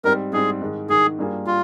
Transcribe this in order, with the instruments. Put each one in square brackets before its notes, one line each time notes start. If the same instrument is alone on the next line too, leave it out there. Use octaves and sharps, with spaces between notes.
[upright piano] G#2 G3 C4 [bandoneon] A#4
[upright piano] G#2 G3 C4 [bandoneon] G#4
[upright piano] G#2 D#3 G#3
[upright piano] G#2 D#3 G#3 [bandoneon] G#4
[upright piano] G2 G3 A#3 F4 G#4
[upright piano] G3 [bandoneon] F4